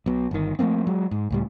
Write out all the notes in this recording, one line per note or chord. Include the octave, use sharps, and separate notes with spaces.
B1 B2
G1 D#3
F3 A3 A#3 C4
F#3 G#3
G#2
C#2 A2 G3